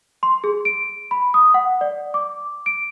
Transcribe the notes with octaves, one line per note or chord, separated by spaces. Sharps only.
C6
G#4
D7
B5
D#6
F#5
D5
D6
D7